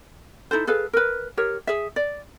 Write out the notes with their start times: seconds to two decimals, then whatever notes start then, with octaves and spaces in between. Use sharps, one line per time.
0.51 D#4 E4 A4 C5
0.67 G#4 A4 B4 F5
0.93 A#4 B4
1.37 G4 A#4 C#5
1.67 G#4 E5
1.96 D5